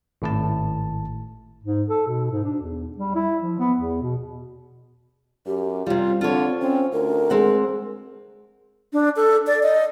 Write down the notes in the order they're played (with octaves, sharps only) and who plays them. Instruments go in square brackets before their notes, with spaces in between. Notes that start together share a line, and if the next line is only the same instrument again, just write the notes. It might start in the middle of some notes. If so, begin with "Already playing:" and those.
[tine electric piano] G#1 A2 A5
[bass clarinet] G#2
A4
B2
G#2
D4
E2
G3
E4
F3
B3
E2
B2
[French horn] F#2 [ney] G4
[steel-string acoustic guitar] C3 G3 [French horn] F4
[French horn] D3 [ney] C4 [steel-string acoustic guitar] F4 A4 C#5
[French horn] C4 [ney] C#4
[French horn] D2 [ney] A#4
[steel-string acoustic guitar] G#3 C4 F#5
[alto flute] D4
A4
D5
D#5